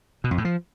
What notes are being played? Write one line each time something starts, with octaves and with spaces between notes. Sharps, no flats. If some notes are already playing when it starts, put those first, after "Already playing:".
B2
F2
A2
F3